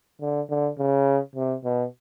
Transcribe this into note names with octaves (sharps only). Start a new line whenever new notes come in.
D3
D3
C#3
C3
B2